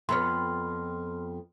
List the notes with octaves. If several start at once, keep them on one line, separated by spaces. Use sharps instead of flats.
F2 B3 C#5 C6 F6